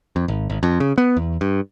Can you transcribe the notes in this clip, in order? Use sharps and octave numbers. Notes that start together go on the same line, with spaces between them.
F2
G#1
G#1
F2
C#3
B3
E2
G2